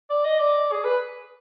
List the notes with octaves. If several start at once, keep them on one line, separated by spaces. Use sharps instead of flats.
D5
D#5
D5
G#4
B4